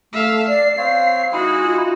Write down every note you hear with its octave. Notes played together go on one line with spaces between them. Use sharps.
A3 E5 F5
D5 C7
C4 C#5 F5
G#3 D#4 E4 F#4 G#4
F4